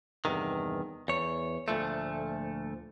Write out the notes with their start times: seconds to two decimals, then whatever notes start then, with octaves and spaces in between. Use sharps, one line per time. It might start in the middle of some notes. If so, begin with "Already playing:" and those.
0.25 E2 G2 C3 D#3
1.08 E2 C#5
1.68 D2 A#2 F3 A3